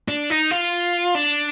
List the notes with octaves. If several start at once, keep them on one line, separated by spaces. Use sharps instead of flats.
D4
D#4
F4
D4